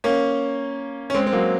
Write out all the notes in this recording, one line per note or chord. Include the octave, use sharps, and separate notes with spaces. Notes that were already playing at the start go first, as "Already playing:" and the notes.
A#3 C#4
C#4
G#3 C4
C4
F#3 A#3